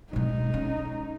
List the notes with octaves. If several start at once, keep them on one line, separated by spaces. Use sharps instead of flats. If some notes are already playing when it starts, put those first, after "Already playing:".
B2 G#3 D#4
C#4